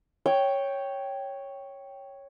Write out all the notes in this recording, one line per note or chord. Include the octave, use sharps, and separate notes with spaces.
C#5 G5